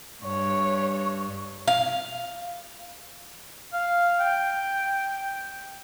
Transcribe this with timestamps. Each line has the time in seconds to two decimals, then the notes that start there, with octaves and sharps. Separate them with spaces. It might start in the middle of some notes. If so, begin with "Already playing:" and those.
0.25 G2 C#5
1.68 F5
3.73 F5
4.20 G5